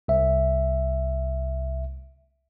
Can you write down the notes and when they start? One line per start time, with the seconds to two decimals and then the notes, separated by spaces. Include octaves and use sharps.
0.08 C2 E5